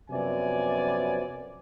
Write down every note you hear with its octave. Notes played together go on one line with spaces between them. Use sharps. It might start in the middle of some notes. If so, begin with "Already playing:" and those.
F#2 C3 F3 B3 D5 G#5